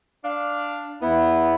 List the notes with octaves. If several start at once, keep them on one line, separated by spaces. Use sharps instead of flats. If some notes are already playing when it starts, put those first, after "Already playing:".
D4 F5
E2 B3 E4